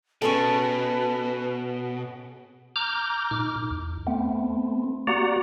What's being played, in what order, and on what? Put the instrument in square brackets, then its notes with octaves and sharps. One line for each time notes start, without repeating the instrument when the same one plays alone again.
[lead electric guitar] B2 [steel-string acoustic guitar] C#4 G#4 A4 [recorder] B4 [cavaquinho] A5 C#6
[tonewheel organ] A#5 D6 F6 G6
A#2 D#4 D6 F6
E2
A3 B3 C4
A#3 F#4 G4 D5 F#5 A#5